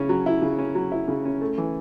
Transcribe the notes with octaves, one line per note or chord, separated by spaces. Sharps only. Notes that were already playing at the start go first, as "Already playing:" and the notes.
Already playing: C#3 C#4 E4
F#3
E4
C#3
C#4
F#3
E4
C#3
C#4
A3
E3